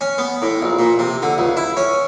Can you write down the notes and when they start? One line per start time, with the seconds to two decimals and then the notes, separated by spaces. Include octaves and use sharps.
0.01 C#4
0.18 B3
0.42 A2
0.62 A#1
0.79 A#2
0.99 C3
1.22 D3
1.38 C#2
1.57 E4
1.77 C#4